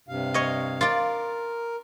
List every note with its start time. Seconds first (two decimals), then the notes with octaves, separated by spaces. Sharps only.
0.08 G2 C3 F5
0.34 C#5 D#5
0.81 F4 A#4 D5